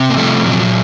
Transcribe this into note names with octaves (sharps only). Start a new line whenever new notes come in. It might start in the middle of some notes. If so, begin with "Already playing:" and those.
Already playing: C3
A#3
F3 G3 A3
A#2 F#3